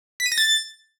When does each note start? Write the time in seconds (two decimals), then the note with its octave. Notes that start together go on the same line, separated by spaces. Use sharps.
0.20 B6
0.26 D#7
0.32 A#6
0.38 A6